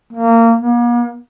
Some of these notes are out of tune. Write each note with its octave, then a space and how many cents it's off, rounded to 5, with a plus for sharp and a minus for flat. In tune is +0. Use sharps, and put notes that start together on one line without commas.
A#3 -25
A#3 +45